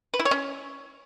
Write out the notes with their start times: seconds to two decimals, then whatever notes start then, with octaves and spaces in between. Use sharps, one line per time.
0.14 B4
0.19 E4
0.25 C#5
0.31 C#4